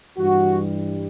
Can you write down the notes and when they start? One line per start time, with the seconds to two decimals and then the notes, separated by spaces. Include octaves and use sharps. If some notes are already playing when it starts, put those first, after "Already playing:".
0.18 G2 E3 G3 F#4